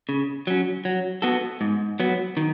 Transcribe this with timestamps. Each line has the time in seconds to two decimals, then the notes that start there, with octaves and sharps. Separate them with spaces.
0.09 C#3
0.47 F#3 C#4
0.85 F#3
1.22 B3 F#4 A4
1.61 G#2
2.00 F#3 B3
2.37 D#3